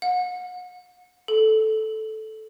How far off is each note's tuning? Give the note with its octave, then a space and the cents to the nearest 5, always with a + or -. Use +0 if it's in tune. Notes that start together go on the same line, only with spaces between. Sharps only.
F#5 -35
A4 -10